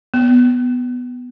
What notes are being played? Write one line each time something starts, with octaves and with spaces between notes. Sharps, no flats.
B3